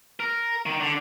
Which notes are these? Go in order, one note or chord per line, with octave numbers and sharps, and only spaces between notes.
A#4
D#3
D3